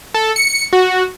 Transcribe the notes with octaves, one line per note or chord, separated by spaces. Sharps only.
A4
C#7
F#4